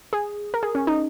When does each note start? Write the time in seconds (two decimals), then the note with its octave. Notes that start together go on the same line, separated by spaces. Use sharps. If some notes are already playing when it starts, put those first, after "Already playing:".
0.13 G#4
0.54 A#4
0.63 G#4
0.75 C#4
0.87 D#4